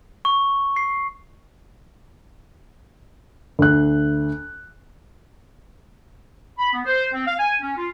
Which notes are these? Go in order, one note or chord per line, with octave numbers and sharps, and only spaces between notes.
C#6
C7
D2 F#6
B5
B3
C5
C4
F5
G#5
C#4
F4